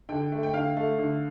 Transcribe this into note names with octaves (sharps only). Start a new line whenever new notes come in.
D3 G5
A3
G5
D3 F5
A3
D3